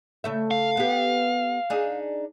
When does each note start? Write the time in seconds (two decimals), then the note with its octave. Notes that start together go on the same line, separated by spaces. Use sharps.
0.24 C#3 A3 E5
0.51 F5
0.77 B3 G4
1.70 D4 D#4 G#4